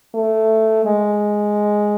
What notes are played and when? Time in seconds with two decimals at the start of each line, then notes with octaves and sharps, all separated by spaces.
0.15 A3
0.85 G#3